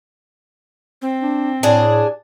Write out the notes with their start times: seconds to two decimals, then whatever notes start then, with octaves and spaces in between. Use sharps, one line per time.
1.02 C4
1.22 D4
1.63 A2 D4 G#4